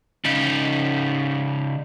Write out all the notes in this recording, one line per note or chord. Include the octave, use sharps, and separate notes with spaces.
C#3 D#4